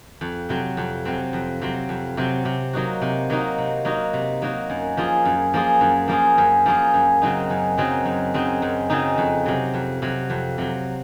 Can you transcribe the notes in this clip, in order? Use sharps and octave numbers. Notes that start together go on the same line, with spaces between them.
F2
C3 F#3 C4
F2
C3 F#3 C4
F2
C3 F#3 C4
F2
C3 F#3 C4
C3
F#3 A#3 D#4 F#4
C3
F#3 A#3 D#4 F#4
C3
F#3 A#3 D#4 F#4
C3
F#3 A#3 D#4 F#4
F#2
F3 A#3 F4 G#4
F#2
F3 A#3 F4 G#4
F#2
F3 A#3 F4 G#4
F#2
F3 A#3 F4 G#4
F#2
C#3 F#3 C4 D#4
F#2
C#3 F#3 C4 D#4
F#2
C#3 F#3 C4 D#4
F#2
C#3 F#3 C4 D#4
F2
C3 F#3
F2
C3 F#3
F2
C3 F#3